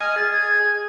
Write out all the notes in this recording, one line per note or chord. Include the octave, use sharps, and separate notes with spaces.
D#5 G#5 F6
G#4 A6
G#6